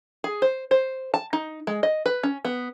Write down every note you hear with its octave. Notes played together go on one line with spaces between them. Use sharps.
G#4
C5
C5
A5
D#4
G#3
D#5
B4
C#4
B3